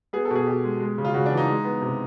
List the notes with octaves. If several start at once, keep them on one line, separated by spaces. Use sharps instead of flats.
B3 G#4
A4
B2 G#4
B2 G4
G#3
G#3
C#3
F4
C#3 F#4
D4
E3
D#4
G#3
B3
C3